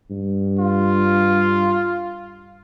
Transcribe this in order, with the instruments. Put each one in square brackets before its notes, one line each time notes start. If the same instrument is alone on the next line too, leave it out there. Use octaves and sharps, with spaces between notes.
[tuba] G2
[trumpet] F4